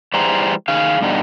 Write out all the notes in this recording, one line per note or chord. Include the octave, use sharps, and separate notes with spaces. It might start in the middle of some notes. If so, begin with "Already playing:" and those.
E3 G3 G#4 C5 A#5
D#3 G#4 F5
G2 B2 D3 G3 D#4